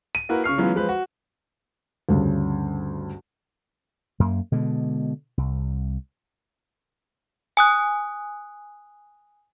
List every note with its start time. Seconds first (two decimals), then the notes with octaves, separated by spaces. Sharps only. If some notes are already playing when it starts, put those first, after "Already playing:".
0.15 D#7
0.29 A#3 E4 F#4 A#4 B4
0.44 C#3 C#6 F6 C7
0.58 E3 F#3 G#3 B3 C#4 F4
0.75 F3 G#3 B4 C5
0.89 F#4
2.09 D2 G2 C#3
4.20 F#2 A#3
4.52 B2 D3 G#3
5.37 C2
7.57 G#5 D#6 F#6